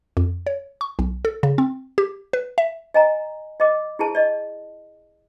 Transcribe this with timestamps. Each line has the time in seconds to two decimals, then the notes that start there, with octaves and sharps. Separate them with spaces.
0.17 F2
0.47 C#5
0.81 C#6
0.99 B1
1.25 A4
1.43 C#3
1.58 C4
1.98 G4
2.33 B4
2.58 E5
2.94 D#5 G#5 A#5
3.60 D#5 D6
3.99 E4 G#4 A5
4.15 D5 D#5